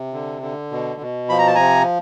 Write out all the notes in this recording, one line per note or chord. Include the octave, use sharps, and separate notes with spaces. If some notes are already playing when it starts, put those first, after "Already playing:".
Already playing: C3
D3
D3
B2
B2
F3 B5
A#5
A5
C3 G#5 A#5